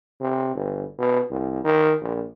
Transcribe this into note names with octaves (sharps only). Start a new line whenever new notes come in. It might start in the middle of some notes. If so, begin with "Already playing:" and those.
C3
G1
B2
C2
D#3
A#1